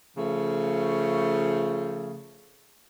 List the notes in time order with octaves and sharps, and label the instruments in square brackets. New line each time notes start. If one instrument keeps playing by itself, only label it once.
[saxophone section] C#3 F3 A3